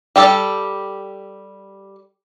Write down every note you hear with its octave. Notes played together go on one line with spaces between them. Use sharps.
G3 G4 A4